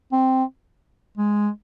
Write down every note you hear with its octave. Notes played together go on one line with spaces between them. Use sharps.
C4
G#3